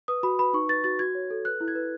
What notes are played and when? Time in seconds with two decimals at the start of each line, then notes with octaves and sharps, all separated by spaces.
0.08 B4 D#6
0.23 F#4 B5
0.39 B4 B5
0.53 D#4 C#6
0.69 B4 A6
0.84 F#4 A6
0.99 F#4 G#6
1.15 C#5
1.30 A4
1.45 B4 F#6
1.61 E4
1.68 G#6
1.75 B4